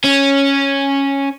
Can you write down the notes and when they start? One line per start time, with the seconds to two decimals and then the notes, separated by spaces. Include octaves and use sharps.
0.04 C#4